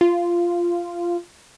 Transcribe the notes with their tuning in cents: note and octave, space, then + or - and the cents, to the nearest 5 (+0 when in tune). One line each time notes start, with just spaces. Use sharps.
F4 -10